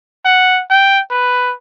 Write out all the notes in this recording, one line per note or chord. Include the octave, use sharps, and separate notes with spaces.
F#5
G5
B4